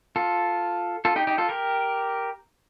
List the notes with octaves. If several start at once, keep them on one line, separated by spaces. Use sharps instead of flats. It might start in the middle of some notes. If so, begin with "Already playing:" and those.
F4 A4
F4 A4
D#4 G4
D#4 G4
F4 A4
G4 A#4